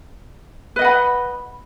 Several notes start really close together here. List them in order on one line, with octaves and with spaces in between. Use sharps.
B4 D#5 F#5 B5